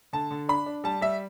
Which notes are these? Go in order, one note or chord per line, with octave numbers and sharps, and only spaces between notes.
D3 A5
D3
D4 B5
D4
G3 A5
G3 E5